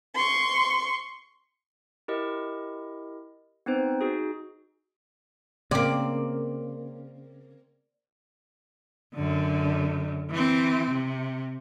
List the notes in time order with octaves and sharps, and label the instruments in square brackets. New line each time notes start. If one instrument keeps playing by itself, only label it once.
[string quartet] C6 C#6
[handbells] E4 G4 A#4 D#5
B3 C4 D#4 C5
D#4 F#4 G#4
[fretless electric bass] C#3 [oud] A#3 C4 [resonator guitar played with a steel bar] D5
[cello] F#2 D3
E3 C4
C3